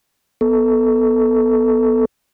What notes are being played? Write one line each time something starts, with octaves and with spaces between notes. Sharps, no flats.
B3 A4